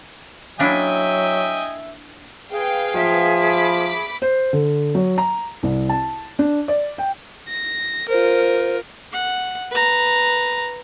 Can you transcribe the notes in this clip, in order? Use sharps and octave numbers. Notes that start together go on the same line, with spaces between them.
F#3 A#3 D4 E4 D#5 E5 G5 G#5
G#4 B4 F5 G5
F3 E5
B5 D6 B6
C5
D3
F#3
A#5
C2
A5
D4
D5
G5
A#6
F4 A#4 C5
F#5
B4 A#5